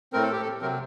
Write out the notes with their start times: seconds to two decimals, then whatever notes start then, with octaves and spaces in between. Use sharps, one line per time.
0.13 A2 A3 C4 A#4
0.23 A4
0.32 G4
0.42 A4
0.62 C3 F#3 C4 A#4